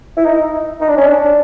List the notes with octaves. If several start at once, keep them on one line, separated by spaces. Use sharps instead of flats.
E4
D#4
D#4
D4
C#4
D4